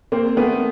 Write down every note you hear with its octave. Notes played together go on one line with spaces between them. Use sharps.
A#3 C4
A3 B3